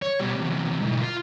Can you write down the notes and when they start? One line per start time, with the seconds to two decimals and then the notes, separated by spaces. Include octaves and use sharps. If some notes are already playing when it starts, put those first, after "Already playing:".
0.02 C#5
0.20 B2 G3
0.36 E2 C3
0.82 G#2 B2
1.01 F4